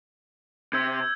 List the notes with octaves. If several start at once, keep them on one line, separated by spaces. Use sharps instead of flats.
C3 E6 G6 G#6